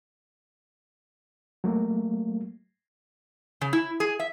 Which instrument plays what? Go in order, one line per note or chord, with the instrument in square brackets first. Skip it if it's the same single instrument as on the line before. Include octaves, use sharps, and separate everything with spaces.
[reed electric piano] F#3 A3 A#3
[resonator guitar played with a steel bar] C#3
E4
G#4
E5